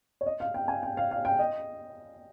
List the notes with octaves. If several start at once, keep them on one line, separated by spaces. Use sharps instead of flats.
C#5
D#5
F5
G5
G#5
G5
F5
F5
G5
D#5